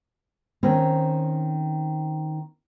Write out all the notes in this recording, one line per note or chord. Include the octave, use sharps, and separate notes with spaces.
D#3 C4 C#4